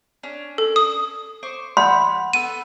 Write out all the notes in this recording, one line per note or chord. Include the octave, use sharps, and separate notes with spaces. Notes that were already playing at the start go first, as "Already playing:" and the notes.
C#4 D4
A4
D#6
C5 C#6 D6
F#5 B5 C6 G6
B3 A4 D#7